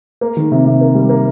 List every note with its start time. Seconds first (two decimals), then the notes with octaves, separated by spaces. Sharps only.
0.21 A#3
0.37 D#3
0.52 C3
0.65 C3
0.81 A#3
0.95 G3
1.09 A#3